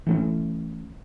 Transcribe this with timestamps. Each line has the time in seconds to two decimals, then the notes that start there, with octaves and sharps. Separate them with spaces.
0.07 E3 A3 C#4